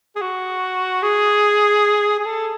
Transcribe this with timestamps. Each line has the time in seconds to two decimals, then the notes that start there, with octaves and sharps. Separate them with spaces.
0.16 G#4
0.21 F#4
1.03 G#4
2.19 G#4
2.25 A4